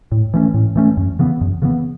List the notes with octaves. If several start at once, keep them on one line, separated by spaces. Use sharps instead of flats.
A2
E3 A3 C#4
A2
E3 A3 C#4
F#2
C#3 E3 B3
F#2
C#3 E3 B3